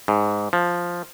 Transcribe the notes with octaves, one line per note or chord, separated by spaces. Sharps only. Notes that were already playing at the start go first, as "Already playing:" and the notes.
G#2
F3